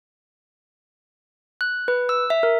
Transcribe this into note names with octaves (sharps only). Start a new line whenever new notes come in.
F#6
B4
E6
E5
A#4